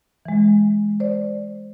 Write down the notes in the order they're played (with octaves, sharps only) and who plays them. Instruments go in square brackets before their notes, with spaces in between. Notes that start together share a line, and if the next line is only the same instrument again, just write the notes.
[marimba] E3 G#3
C5 D5